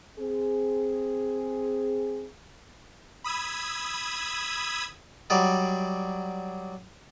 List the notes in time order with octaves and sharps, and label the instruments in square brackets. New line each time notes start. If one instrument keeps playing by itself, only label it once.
[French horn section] C4 G#4
[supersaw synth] B5 D#6 E6 G#6
[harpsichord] F#3 G3 D5 D#5